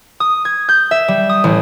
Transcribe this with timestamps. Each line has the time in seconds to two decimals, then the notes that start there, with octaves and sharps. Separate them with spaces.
0.20 D#6
0.45 G#6
0.69 G6
0.91 E5
1.08 G3
1.29 D#6
1.44 A1